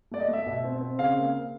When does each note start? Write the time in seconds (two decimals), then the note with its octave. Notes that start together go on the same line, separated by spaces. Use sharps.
0.11 A3 D5
0.20 D#5
0.28 A3 E5
0.46 B2
0.64 C4
0.81 C4
0.99 C#3 F5
1.16 A#3
1.33 A#3